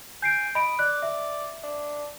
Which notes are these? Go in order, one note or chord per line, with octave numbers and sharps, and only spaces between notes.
G#5 G6 C7 D7
D#5 B5 D7
D5 F#6
E5
D4